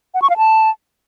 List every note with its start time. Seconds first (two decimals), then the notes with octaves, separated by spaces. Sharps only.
0.14 F#5
0.22 C#6
0.30 F5
0.37 A5